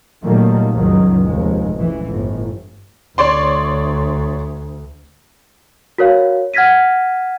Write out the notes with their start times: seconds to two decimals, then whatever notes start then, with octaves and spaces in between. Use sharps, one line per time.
0.23 A#2 D#3 F#3 G3 A3 A#3
0.73 F#1 C#2 G2 D#3 F#3
1.23 F1 D#2 G#3
1.73 C#2 A2 E3
2.06 G1 A2
3.18 D2 C#5 D5 C6
5.98 F#4 A#4 C#5 F5
6.54 F#5 F6 G#6 A#6 B6 D#7